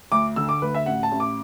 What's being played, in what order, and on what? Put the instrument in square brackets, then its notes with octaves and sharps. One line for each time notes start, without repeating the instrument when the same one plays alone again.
[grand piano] D2 D6
D3 E6
D6
D2 B4
E5
A1 F#5
A5
A1
D6